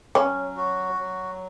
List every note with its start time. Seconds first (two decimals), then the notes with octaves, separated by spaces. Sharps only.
0.15 F#3 C#4
0.57 F#4
0.98 F#3